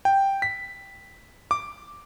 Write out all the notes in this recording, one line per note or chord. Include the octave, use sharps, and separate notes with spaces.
G5
B6
D6